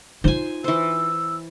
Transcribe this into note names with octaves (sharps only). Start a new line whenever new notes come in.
D#4 F4 C5 G#5
E3 C5 E6